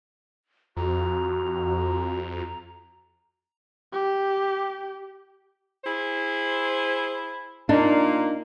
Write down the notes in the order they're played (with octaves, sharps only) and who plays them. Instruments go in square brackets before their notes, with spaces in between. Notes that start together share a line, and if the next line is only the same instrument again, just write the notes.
[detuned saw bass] F2 [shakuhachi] F#4 [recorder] A#5
[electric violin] G4
[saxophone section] E4 G#4 C5
[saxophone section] A#2 A#3 [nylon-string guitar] D4 D#4